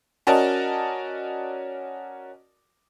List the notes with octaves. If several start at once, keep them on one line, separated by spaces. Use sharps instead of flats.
C#4 F#4 A#4 D5 D#5 A5